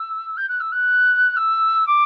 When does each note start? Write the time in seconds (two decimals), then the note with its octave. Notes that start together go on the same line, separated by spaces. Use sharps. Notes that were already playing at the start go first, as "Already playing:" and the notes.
Already playing: E6
0.37 G6
0.48 F#6
0.60 E6
0.71 F#6
1.36 E6
1.86 D6